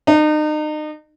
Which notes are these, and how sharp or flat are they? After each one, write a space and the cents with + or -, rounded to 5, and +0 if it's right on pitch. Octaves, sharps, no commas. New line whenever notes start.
D#4 -35